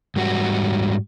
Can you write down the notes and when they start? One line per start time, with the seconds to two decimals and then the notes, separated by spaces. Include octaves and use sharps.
0.16 G#2 G3 F#4